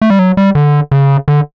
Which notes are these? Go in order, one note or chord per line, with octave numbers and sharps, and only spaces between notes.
A3
G3
F#3
G3
D3
C#3
D3